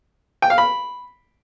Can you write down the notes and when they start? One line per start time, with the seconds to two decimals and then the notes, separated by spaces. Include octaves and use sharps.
0.42 G5
0.50 F5
0.58 B5